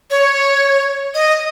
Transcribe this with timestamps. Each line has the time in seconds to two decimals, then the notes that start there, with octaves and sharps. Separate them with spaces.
0.10 C#5
1.14 D#5